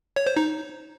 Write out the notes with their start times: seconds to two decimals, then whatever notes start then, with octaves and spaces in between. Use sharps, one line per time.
0.16 C#5
0.26 C5
0.37 D#4